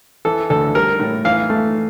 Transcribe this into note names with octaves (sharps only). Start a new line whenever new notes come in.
E3 A4
D2 A4
G3 A#4
A2
E3 F5
A3